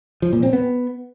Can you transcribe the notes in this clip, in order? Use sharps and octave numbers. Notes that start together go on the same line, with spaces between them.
F3
A#2
C4
B3